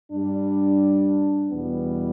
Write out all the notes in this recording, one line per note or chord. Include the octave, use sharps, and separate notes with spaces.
G2 G3 D4
E2 B2 G3 B3